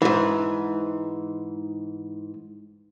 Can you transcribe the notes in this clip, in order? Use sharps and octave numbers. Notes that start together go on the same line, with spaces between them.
G#2 E3